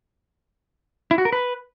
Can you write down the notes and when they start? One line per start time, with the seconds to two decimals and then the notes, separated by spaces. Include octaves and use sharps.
1.11 E4
1.18 F#4
1.25 A#4
1.32 B4